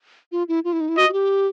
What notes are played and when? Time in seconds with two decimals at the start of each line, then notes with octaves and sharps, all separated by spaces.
0.32 F4
0.48 E4
0.64 F4
0.73 E4
0.81 D#4
0.89 E4
0.97 F#4 D#5
1.09 F#4
1.13 G4